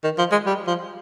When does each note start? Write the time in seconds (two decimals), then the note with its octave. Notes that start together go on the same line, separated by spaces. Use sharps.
0.04 D#3
0.18 F3
0.32 G#3
0.46 G3
0.67 F3